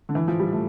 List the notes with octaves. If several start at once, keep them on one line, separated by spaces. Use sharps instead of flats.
D3
E3
F3
G3
A3